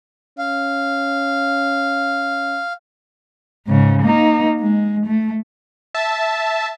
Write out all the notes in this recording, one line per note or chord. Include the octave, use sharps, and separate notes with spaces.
C#4 F5
G#2 C#3
A#3 D#4
G#3
A3
E5 A5